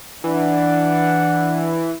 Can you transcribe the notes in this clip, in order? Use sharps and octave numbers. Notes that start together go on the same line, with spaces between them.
E3 D4 F#5